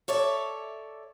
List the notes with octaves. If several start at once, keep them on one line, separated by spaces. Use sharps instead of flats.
A4 C#5 D5 E5